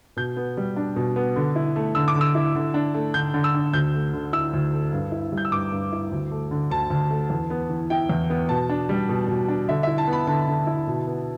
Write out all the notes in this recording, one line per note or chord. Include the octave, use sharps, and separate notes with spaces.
B2 G6
B3
G3
D4
B2
B3
D3
E4
A3
D3 E6
D6
D3
E6
E4
D3
D4
A3
D3 G6
D3
E6
D4
D2 G6
A3
D3
E4 E6
D2
A3
G2
E4
G3
G6
E6
G2 D6
G2
E4
D2
A3
D3
D2 A5
D2
A3
E2
B3
E3
E4 G5
E2
B3
B2 A5
D4
G3
B2
B2
D4
D3 E5
E4 E5
A5
B3
B5
D3 A5
D3
E4
B2
B3